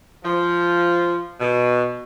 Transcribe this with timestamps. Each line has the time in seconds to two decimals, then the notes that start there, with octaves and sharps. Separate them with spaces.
0.24 F3
1.39 B2